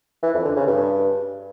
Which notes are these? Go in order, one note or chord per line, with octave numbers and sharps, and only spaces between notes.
E3
F2
D3
C#3
G2